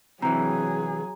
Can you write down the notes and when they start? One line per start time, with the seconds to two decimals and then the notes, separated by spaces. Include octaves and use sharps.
0.22 C3 E3 F#3 G#4 A#5